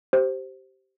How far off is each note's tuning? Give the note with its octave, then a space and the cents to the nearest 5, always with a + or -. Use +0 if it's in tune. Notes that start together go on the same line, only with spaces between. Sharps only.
G4 -20 C5 +0